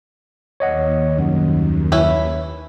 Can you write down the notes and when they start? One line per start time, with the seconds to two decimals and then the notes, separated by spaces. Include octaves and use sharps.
0.60 D#2 C#5 D#5 F#5
1.18 C2 F#2
1.92 C#4 E4 B4